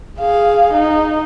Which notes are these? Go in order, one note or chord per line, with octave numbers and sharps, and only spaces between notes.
G#4 F5
D#4